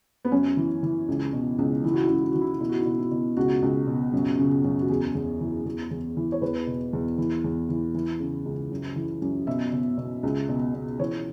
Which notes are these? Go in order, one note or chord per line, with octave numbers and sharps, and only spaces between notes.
B3
F#2 C#4
E3
E3
C#2
B2
C#2
E3 E4
F#4
E4
C#2 F#4
E4
E3 F#4
E4
F#4
B2 E4
F#4
E4
B2 F#4
E4
B2
C#2 F#4
C#2
B2
F#2
C#3
F#2
F#4
E2 G#4
E2
E3
E2
E2
E3
C#5
E2 B4
B2
E2
E3
E2
E3
E3
C#3
C#2
F#2
E3
F#2
B2 E5
B2
B2
C#2
B2
B2
E3 C#5